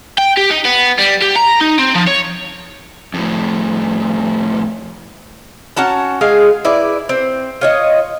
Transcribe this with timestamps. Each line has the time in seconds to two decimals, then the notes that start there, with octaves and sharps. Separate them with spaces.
0.18 G5
0.37 G4
0.51 D#4
0.65 B3
0.98 G3
1.22 G4
1.36 A#5
1.61 D#4
1.79 C4
1.95 F3
2.07 C#5
3.14 F2 A2
5.77 C#4 F#4 A5 A#5
6.21 G#3 F4 G#4 F5
6.65 E4 B4 D5
7.09 C4
7.61 F4 C#5 D#5